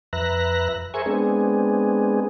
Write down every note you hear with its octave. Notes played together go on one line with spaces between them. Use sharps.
F2 B4 E5 A#5 F#6 A#6
G#4 A#4 C5 E5 G#5 C#6
G#3 B3 C4 D4 G#4